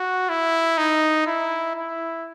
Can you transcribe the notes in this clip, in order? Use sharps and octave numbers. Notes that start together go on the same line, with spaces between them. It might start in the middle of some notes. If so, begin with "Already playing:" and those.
Already playing: F#4
E4
D#4
E4
E4